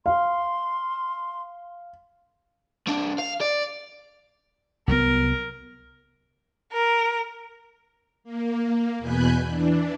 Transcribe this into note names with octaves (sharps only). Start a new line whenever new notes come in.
F5 C6
C2 D4
F5
D5
C2 F#3 B3 A#4
A#4
A#3
E2 B2 G#5 B5 F#6 G6
E3 D4